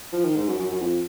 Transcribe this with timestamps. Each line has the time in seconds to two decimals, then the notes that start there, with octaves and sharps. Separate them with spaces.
0.13 F3
0.24 D#3
0.36 G#2
0.48 F#2
0.59 F#2
0.71 F#2
0.82 F2